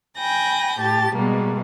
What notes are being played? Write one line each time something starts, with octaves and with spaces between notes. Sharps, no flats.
G5 G#5 B5 G6 A#6
A2 G4 A5 A6
B2 G3 G#3 A#3 B3